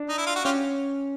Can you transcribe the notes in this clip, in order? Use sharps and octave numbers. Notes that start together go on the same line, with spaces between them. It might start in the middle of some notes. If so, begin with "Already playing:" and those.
Already playing: D4
D#4
E4
F4
F#4
C#4 F4 G4